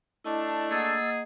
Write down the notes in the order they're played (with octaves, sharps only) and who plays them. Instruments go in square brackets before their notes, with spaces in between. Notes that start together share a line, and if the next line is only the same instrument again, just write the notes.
[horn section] A3 D4 [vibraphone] E4 D#5 A5
[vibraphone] A#3 D#5 F#5 [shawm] G#4 [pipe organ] E6 A6